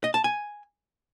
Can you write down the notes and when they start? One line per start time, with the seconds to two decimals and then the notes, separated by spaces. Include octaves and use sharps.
0.04 D#5
0.14 A5
0.24 G#5